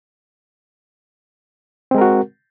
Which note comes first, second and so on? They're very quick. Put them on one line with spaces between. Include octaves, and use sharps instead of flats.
C4 G#3 A#4 F#4